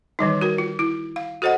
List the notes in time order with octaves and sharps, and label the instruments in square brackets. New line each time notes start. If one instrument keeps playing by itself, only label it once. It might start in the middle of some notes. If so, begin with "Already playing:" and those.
[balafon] D#3 E3 G3 D#4
F#4 A#4
F4
E4
F5
F#4 A4 C5 D#5 F#5